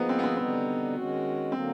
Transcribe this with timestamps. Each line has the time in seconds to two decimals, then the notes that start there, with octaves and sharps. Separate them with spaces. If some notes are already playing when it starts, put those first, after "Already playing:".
Already playing: F3 A#3 B3 D#4 G#4 B4
0.09 C4
0.19 B3
0.23 C4
0.37 D3 G3 B3 C4 D#4
0.95 D#3 G#3 C#4 F#4
1.52 D3 F#3 A#3 C4